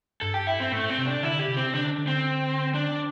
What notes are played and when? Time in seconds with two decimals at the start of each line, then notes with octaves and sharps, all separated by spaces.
0.21 G2 A4
0.34 G4
0.47 E4
0.60 C4
0.72 A2 A3
0.89 C4
0.98 C3
1.06 D4
1.23 D3 E4
1.39 G4
1.48 C3
1.57 C4
1.74 D3 D4
1.98 D3
2.07 C4
2.75 D4